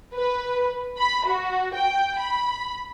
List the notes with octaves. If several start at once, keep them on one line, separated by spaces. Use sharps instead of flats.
B4
B5
F#4
G5
B5